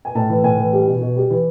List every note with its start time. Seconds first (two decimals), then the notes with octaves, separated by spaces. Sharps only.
0.05 G#5
0.15 A2 A5
0.29 E3
0.44 A2 G#5
0.58 E3
0.73 G3
0.87 B2
1.01 B2
1.16 G3
1.30 E3